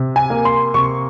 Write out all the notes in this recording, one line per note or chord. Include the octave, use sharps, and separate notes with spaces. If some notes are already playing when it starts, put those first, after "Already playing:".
Already playing: C3
G#5
A#3
C6
C3 C#6